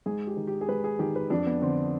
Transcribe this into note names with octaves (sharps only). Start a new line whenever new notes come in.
G#2 G#4
G4
D#3
G4
G#4
G#2 B4
G#4
D#3 G4
B4
F2 D4
B3
D3 C4